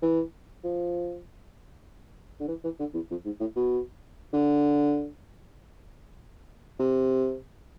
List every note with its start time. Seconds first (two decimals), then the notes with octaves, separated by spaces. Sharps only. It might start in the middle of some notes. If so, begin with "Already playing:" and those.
0.02 E3
0.64 F3
2.40 D3
2.48 E3
2.64 E3
2.80 D3
2.94 E2
3.10 F2
3.25 G#2
3.40 A2
3.56 B2
4.33 D3
6.79 C3